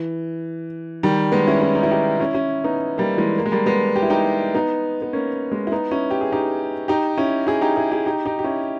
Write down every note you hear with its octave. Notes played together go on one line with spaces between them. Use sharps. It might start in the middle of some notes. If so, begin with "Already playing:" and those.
Already playing: E3
D#3 G3
G#3 B3
C#4 E4
C#4 E4
D#4
E4
D#4 G4
C#4 E4
C#4 E4
B3 D#4
G3 A#3
E3 G#3
A#3
G#3
G3 A#3
G#3 B3
G4
E4
D#4 G4
B3 D#4
B3
A#3 C#4
G#3 B3
E4
B3 D#4
C#4 E4
G4
G#4
D#4 G4
D#4 G4
C#4 E4
E4 G#4
D#4 G4
E4 G#4
E4 G#4
D#4 G4
D#4 G4
G4
C#4 E4